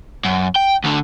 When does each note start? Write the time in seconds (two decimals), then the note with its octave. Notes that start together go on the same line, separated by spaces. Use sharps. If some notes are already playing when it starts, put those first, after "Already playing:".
0.25 F#2
0.55 G5
0.84 D2 D3